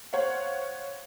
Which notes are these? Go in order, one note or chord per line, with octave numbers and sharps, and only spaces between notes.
C5 C#5 F5 F#5